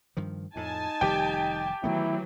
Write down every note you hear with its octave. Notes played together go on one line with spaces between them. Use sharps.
G2 D#3 F3
F2 A2 D#4 G#5 A5
F1 D#3 G3 G4 G5
D#3 E3 F#3 A3 B3 E4